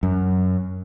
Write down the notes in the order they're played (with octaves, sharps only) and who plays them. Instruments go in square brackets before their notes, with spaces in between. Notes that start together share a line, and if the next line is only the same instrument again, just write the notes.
[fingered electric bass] F#2